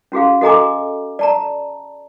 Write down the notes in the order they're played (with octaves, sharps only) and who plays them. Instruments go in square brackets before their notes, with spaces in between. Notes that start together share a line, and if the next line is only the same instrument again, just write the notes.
[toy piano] C#4 F#4 G#4 F5
F#4 A4 D#5 G#5 A#5 D6
D5 A5 A#5